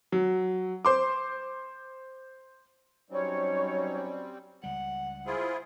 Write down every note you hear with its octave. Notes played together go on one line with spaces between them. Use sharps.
F#3
C5 C6 D6
F#3 G3 C4 C#4 D#4 C#5
C#2 G3 F#5
E4 F4 G#4 C5